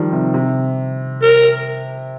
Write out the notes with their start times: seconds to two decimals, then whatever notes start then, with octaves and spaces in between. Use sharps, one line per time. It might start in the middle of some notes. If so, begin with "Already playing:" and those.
Already playing: D#3 F3 G3
0.12 C3
0.34 C3
1.22 A#4